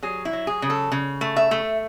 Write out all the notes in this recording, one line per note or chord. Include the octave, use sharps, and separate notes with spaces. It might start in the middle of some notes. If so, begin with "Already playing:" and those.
F#3 G#4
E4
F#3
G#4
C#3
A4
C#3
A3
E5
A3